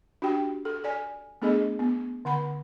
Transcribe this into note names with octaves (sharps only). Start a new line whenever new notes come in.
D4 F#4 G4 G5
A4
A4 D5 G#5
A3 B3 D4 G#4 A4 D#5
B3
D3 F#5 B5